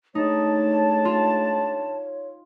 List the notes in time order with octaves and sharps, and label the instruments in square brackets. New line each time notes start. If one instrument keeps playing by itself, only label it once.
[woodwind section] G#2 D4 A5 [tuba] A3 [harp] D#4 [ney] C#5
[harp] F4